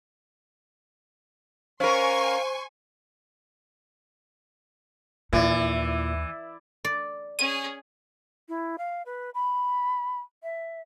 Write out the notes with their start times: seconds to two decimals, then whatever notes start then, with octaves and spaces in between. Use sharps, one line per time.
1.80 C#4 A#4 C5 F5 G#5 C6 C#6
5.33 D#2 A#2 E3 D#4 E4 D5
6.85 D5
7.39 C#4 G#4 D#7
8.49 E4
8.78 F5
9.06 B4
9.34 B5
10.43 E5